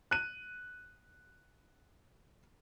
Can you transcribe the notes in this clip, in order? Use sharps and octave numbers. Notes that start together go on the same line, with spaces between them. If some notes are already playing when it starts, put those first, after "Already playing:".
F#6 D#7